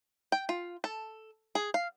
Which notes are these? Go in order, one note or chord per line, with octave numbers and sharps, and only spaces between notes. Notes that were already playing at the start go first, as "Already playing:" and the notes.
G5
F4
A4
G#4
F5